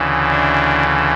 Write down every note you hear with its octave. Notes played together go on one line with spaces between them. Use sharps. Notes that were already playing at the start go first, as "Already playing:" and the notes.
Already playing: D2 C#3 E3
D4